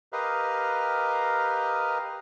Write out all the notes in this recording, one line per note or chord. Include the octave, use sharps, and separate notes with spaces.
G4 A#4 B4 D#5 F5